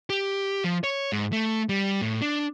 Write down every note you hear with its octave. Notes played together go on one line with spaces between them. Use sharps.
G4
F3
C#5
G#2
A3
G3
A2
D4